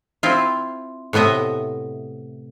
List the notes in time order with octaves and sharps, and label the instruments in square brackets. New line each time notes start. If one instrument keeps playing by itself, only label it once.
[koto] C4 E4 F4
A2 C3 B3 D#5 E5